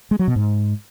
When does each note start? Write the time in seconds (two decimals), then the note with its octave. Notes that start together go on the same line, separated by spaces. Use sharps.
0.11 G#3
0.19 F#3
0.28 B2
0.36 G#2